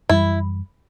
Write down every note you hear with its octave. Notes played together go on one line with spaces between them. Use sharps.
F#2 E3 G3 E4